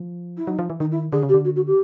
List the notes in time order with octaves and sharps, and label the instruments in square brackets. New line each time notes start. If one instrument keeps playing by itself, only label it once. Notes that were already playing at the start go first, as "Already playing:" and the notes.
Already playing: [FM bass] F3
[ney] E4
[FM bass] F#3 [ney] D#4
[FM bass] F3
E3
[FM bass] D#3 [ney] D#4
[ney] E4
[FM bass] D3 [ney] G#4
[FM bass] C#3
[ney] G4
[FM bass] D3
[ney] F#4
F#4
G4